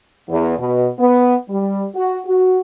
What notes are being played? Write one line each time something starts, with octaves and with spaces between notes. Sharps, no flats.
E2
B2
B3
G3
F#4
F#4